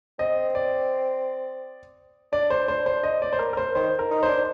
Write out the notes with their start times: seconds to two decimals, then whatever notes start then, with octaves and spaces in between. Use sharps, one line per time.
0.19 C4 D#5
0.55 D5
2.33 D4 D5
2.50 C5
2.68 C5
2.86 C5
3.03 D#5
3.22 D5
3.33 C5
3.39 A#4
3.53 A#4
3.57 C5
3.75 D#3 C5
3.99 A#4
4.11 D#4
4.23 C5
4.28 D4